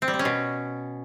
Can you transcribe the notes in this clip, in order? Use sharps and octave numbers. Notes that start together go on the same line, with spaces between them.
C4
G3
C4
C#4
B2